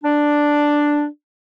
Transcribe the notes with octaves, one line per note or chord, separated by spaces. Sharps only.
D4